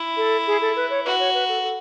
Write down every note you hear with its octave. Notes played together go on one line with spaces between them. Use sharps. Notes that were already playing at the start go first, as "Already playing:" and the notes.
Already playing: E4
A4
G#4
A4
B4
C#5
F#4 B4
C#5
B4
A4
A4